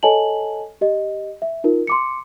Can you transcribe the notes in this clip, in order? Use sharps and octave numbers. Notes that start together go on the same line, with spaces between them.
A4 C#5 D#5 G#5 A5 F#7
G4 D#5
E5
D#4 F4 A#4
C6 D6 C#7